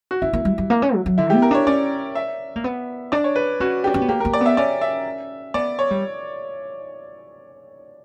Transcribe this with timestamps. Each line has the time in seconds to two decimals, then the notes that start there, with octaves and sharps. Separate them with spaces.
0.11 F#4
0.22 C#4 E4
0.33 A#3
0.45 G3
0.58 G3
0.70 A#3
0.82 C#4
0.95 F#3
1.06 F#3
1.18 D3 E4
1.30 B3 G4
1.42 A#4
1.51 D4 C#5
1.67 C#4 D5
2.15 E5
2.56 A#3
2.64 B3
3.12 D4 D5
3.24 C#5
3.36 B4
3.60 C#4 F#4
3.84 D4 G4
3.94 C#4
4.01 B3
4.08 A#3 G4
4.20 A#3 A#4
4.33 D5
4.41 B3
4.46 E5
4.57 C#4 D5
4.81 E5
5.54 B3 D5
5.79 C#5
5.91 G3